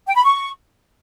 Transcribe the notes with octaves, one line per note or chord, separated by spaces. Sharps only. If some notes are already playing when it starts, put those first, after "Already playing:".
G5
B5
C#6